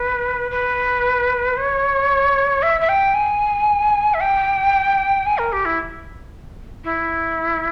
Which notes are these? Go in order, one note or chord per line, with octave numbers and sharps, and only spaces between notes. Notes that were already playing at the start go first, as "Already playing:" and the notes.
Already playing: B4
B4
C#5
E5
E5
G5
G#5
E5
G5
G#5
A#4
G4
E4
E4